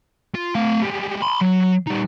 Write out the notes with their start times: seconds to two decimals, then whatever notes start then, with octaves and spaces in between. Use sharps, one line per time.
0.35 F4
0.55 A3 F5
0.82 G3 G#3
1.22 B5 C6
1.41 F#3
1.87 G3 D#4